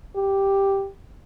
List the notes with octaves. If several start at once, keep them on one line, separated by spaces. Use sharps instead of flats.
G4